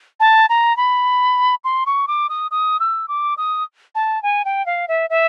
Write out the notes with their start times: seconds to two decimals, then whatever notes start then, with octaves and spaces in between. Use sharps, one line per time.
0.20 A5
0.49 A#5
0.77 B5
1.64 C6
1.86 C#6
2.08 D6
2.29 D#6
2.51 D#6
2.80 E6
3.08 D6
3.38 D#6
3.95 A5
4.23 G#5
4.45 G5
4.66 F5
4.88 E5
5.10 E5